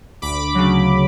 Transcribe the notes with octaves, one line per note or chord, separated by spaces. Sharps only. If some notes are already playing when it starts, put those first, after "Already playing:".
D2 B5 D6
C#3 F#3